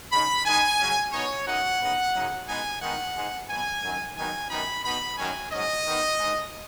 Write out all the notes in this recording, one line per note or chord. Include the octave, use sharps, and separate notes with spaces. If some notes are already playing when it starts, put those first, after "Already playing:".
C#3 G#3 D#4 B5
D#3 G#3 D#4 G#5
C#3 F#3 C#4
B2 B3 D#4 C#5
F#2 F#3 D#4 F#5
C#3 B3 D#4
F#2 C#3 F#3 D#4
B2 G#3 B3 D#4 G#5
D#3 G#3 B3 D#4 F#5
G#2 G#3 D#4
B2 F#3 B3 G#5
F#2 D#3 F#3
D#3 F#3 B3 D#4 G#5
F#2 D#3 B3 D#4 B5
B2 B3 D#4 B5
F#2 D#3 F#3 C#4 G#5
G#2 F#3 C#4 D#5
D#3 B3 D#4
G#2 G#3 D#4